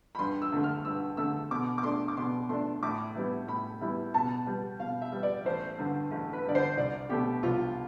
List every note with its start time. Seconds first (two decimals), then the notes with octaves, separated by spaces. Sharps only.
0.15 B5
0.19 G2 C6
0.42 E6
0.52 D3 A3
0.64 F6
0.85 G2 E6
1.17 D3 A3 E6
1.51 B2 D6
1.78 D6
1.83 A3 D4 C6
2.08 D6
2.17 B2 C6
2.49 A3 D4 C6
2.83 A2 D6
3.15 E3 G3 B3 E4
3.47 A2 B5
3.81 E3 G3 B3 E4
4.14 B2 A5
4.46 G3 B3
4.80 B2 F5
5.02 E5
5.12 G3 B3
5.23 D5
5.45 A1 C5
5.78 G2 D3
6.11 A1
6.33 B4
6.45 G2 D3 D5
6.55 C5
6.77 C2 D5
7.10 B2 A3 G4
7.43 C2 F4